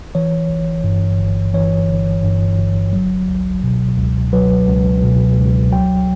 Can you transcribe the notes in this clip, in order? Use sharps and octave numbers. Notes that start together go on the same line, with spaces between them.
E3 C#5
G1
G2
G1
E3 C#5
G1
G2
G1
F#3
C#2
B2
C#2
F#3 B4
C#2
B2
C#2
F#3 G5